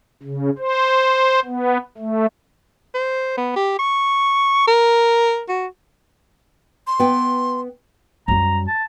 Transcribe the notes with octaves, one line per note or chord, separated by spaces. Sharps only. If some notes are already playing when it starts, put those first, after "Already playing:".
C#3
C5
B3
A3
C5
B3
G4
C#6
A#4
F#4
C6
B3 G5
F#2 G3 A#5
A5